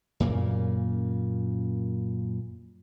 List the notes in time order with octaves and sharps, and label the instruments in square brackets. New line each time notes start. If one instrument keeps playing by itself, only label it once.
[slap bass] F#2 A#2 C#3 A#3